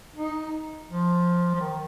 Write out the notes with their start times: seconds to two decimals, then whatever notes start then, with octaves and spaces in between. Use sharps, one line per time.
0.16 D#4
0.89 F3
1.54 F3
1.61 D#3